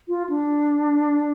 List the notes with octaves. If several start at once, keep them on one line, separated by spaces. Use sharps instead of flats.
F4
D4